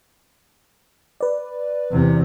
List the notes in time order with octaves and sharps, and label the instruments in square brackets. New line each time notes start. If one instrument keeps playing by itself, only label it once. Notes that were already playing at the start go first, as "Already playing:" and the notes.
[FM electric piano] B4 D5
[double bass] E2 C3